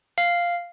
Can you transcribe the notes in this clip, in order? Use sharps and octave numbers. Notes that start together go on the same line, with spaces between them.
F5